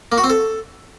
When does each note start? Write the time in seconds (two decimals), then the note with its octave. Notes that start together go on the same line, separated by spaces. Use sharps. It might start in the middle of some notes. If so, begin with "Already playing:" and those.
0.12 A#3
0.18 F#4
0.24 C4
0.30 A4